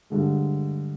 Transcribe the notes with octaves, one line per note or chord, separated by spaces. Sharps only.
G2 D3 G#3